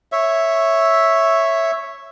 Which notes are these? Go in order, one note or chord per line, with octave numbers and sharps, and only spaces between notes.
C#5 E5